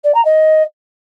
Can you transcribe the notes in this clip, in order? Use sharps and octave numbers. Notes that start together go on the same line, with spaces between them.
D5
A#5
D#5